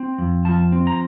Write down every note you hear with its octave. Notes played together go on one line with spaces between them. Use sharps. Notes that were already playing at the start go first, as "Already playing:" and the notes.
Already playing: C4
F2
F3 A5
C4
A#5